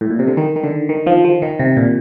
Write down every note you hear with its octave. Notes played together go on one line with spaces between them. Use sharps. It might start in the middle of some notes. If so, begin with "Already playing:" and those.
A2
A#2
C3
D3
D#3
D#3
D3
D#3
F3
F3
D#3
C3
A#2